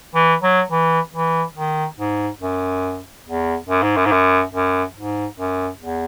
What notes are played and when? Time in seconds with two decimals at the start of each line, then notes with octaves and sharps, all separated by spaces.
0.15 E3
0.42 F#3
0.71 E3
1.14 E3
1.56 D#3
1.99 G#2
2.41 F#2
3.26 E2
3.69 F#2
3.82 G#2
3.97 F#2
4.06 G#2
4.12 F#2
4.54 F#2
4.97 G#2
5.40 F#2
5.82 E2